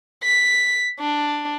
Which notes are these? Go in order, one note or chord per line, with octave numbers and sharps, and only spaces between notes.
B6
D4